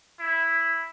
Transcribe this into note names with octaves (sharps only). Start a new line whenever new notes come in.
E4